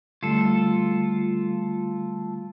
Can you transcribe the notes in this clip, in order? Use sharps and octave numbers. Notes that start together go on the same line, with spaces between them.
D3 G3 A3 F4 A4